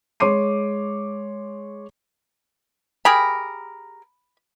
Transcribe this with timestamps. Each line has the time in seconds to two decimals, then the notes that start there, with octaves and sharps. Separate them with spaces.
0.20 G#3 C#5 C6 D6 C7 D#7
3.05 G4 G#4 A#4 B5